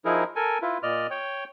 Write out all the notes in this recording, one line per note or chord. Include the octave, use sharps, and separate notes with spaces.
F3 D#4 E4 G#4 A#4
A4 A#4 G#5
E4 F4 B4
A#2 D5 D#5 F6
C#5 G5